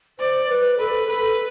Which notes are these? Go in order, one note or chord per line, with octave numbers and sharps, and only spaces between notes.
C5 D5
B4
A4 B4
A4 B4